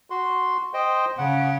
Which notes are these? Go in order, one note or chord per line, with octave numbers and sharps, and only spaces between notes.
F#4 C6
C5 D#5 G5
C#3 F#5